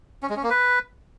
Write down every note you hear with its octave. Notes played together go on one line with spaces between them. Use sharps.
C#4
G#3
C#4
A#3
B4